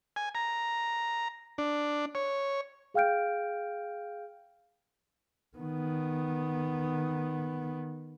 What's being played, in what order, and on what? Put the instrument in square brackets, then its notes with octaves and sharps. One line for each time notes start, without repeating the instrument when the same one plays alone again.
[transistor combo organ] G#5
A#5
D4
C#5
[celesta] G#4 F5 G5 F6 G6 D7
[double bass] D#3 B3